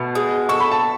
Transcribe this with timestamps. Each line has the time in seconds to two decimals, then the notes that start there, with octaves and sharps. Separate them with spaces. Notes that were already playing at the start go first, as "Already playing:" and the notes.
Already playing: B2 A3
0.15 G#3
0.49 A4 C#6
0.60 B5
0.72 A5